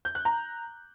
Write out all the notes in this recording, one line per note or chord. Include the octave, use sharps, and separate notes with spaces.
G6
F#6
A#5